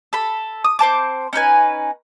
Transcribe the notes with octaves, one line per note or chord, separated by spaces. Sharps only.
A4 B5
D#6
C4 C5 A5 D6
C#4 D#4 B4 G#5